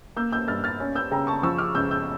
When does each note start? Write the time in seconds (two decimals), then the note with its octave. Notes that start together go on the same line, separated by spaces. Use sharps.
0.16 A#3 E6 G6
0.32 E6 G6
0.48 G2 F6 A6
0.64 F6 A6
0.80 C#4
0.95 E6 G6
1.11 C#3 G5 A#5
1.27 A5 C#6
1.43 F3 C#6 E6
1.58 D6 F6
1.75 C#2 E6 G6
1.91 E6 G6